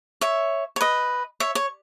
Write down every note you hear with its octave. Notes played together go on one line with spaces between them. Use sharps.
C#5 E5
C#5
B4 D#5
C#5 E5
C#5